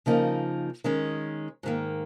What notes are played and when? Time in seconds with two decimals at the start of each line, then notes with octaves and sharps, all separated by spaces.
0.06 C#3 F3 A#3 D#4
0.84 D#3 G#3 C#4
1.63 G#2 D#3 A#3